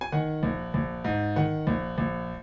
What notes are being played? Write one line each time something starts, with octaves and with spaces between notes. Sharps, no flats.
G#5
D#3 F#5
A#1
A#1
G#2
D#3 F#5
A#1
A#1